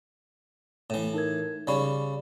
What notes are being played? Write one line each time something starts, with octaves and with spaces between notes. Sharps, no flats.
A2 E3
D#4 A#4 G#6
C#3 G3 D5 B5 C#6